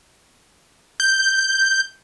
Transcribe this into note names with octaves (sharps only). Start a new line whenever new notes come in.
G6